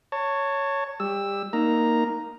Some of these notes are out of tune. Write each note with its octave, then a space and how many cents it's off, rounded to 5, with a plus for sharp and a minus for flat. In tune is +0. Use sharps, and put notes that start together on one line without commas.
C#5 +0 A5 +30
G3 +30 G4 +25 E6 +0
A#3 +0 D#4 +0 A#5 +0